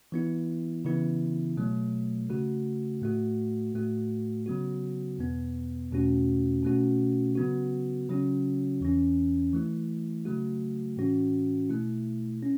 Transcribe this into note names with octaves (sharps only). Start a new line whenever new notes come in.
E3 B3 E4
C#3 E3 B3 E4
B2 F#3 A3
C#3 A3 F#4
A2 A3 F#4
A2 A3 F#4
C#3 F#3 B3 F#4
E2 B2 B3
E2 B2 A3 C#4 F#4
B2 A3 C#4 F#4
C#3 F#3 B3 F#4
C#3 F#3 C#4 F#4
E2 E3 C#4
E3 A3 E4
C#3 F#3 A3 F#4
A2 E3 C#4 F#4
B2 A3 E4
C#4